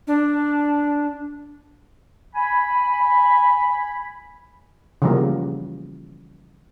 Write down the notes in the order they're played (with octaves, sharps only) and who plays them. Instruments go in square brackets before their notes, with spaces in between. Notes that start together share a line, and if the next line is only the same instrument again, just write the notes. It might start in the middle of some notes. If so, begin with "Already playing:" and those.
[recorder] D4
[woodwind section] G#5 B5
[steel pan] C#3 E3 F3 G3 A#3 B3